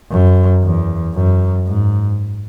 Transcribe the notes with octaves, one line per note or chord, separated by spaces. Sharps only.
F#2
E2
F#2
G#2